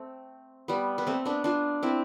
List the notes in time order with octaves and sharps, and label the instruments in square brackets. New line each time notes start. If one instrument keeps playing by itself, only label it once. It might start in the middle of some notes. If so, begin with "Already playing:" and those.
Already playing: [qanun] A3 C4
G3 B3
B3
A3 C4
B3 D4
D4 F4
C4 E4